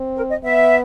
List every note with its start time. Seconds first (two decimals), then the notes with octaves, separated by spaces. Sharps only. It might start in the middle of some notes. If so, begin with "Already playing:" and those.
Already playing: C4
0.16 A#4
0.29 D#5
0.43 B3 E5